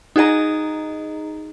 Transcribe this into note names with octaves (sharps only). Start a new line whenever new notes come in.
D#4 F#4 G#4 D#5 A#5